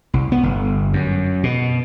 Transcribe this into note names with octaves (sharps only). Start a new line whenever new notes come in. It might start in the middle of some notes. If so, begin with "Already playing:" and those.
C2
B3
G1
F#2
B2